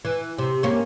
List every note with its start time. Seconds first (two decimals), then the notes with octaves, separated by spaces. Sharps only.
0.05 E3
0.38 C3
0.63 A#3 C#4